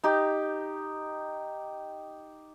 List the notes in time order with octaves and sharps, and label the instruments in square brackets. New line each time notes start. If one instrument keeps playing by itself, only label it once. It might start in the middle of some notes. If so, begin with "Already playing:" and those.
[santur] D#4 G4